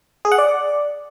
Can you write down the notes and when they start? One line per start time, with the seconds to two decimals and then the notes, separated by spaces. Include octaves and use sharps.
0.25 G#4
0.32 F#5
0.38 D5